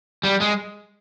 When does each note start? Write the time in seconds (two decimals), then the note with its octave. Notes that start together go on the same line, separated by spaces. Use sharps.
0.23 G3
0.40 G#3